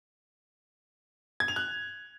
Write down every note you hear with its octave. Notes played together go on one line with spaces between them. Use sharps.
G#6
F7
F#6